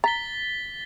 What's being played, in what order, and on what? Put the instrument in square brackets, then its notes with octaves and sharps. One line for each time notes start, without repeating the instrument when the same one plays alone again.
[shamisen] A#5 [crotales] A6 B6 G7